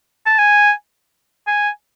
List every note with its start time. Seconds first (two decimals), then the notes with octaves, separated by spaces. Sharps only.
0.26 A5
0.39 G#5
1.47 G#5